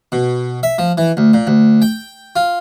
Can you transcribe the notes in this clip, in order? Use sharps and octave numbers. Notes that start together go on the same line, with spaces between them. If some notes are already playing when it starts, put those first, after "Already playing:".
B2
E5
F3
E3
D2
A#2
D2
G5
F4